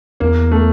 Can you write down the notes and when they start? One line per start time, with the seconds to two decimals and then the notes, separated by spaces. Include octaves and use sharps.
0.20 E2 A#3
0.52 A3